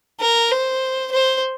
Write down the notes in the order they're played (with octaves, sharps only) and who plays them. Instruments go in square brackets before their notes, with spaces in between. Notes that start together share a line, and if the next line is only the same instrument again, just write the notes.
[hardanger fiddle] A#4
C5
C5